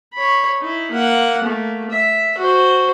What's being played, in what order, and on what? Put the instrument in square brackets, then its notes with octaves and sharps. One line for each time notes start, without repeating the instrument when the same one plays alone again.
[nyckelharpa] C#5 B5
D#4 E4
A#3 F#5
A3 A#3
E5
F#4 C5